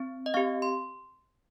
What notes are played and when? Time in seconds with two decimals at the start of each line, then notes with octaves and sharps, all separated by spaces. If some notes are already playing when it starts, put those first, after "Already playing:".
Already playing: C4
0.26 D#5
0.34 C4 G4 F5
0.62 C6